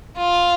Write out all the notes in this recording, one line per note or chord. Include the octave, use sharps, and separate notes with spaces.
F4